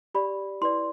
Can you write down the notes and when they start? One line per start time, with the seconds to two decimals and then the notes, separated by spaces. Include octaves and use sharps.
0.15 G4 D5 B5
0.61 E4 B4 D5 C6